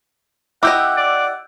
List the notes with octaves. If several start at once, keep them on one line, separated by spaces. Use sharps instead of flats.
E4 G4 D#5 F#5 D6 E6 G6
D5